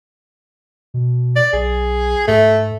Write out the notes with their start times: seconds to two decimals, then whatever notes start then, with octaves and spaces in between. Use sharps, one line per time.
0.94 B2
1.36 D5
1.53 B1 G#4
2.28 G#2 A3